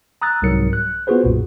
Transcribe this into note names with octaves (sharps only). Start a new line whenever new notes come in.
A#5 D#6 E6 F#6 A6
C2 G#2 F#3 A#4 C#7
F#6
B3 F4 F#4 G#4 B4 C5
B1 F#2 A#2